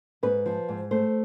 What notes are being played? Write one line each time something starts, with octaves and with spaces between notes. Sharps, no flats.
G#2 B4
F3
G#2
A3 C5